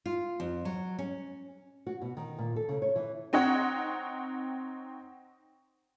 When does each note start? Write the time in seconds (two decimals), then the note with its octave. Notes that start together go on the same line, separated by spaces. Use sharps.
0.06 F4
0.40 F2
0.65 F#3
0.99 C#4
1.87 F#4
2.02 B2
2.17 D#3
2.38 A#2
2.56 A4
2.69 C#3
2.82 C#5
2.96 E3
3.33 C4 D#4 C#5 F#5 G5